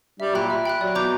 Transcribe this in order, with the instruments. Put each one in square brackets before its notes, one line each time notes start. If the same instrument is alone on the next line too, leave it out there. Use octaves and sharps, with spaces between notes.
[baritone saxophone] G3 [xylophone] E5
[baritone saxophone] A#2 [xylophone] G5 B5 F#6
[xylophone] E5
G5 B5 F#6
[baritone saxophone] F#3 [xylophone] D5
[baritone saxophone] B2 [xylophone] A#5 D6 G6